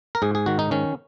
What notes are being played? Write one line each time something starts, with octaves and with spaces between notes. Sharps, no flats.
A#4
G#2 G#4
G#4
D#3 F#4
D#4
D#3 C#4